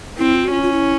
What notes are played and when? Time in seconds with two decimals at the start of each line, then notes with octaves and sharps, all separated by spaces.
0.18 C4 E4
0.35 F4
0.44 F#4
0.51 C#4 F4
0.62 F4
0.72 E4